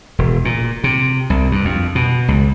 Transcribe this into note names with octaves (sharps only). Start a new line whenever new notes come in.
E1
A#2
C3
C2
G2
F2
B2
C#2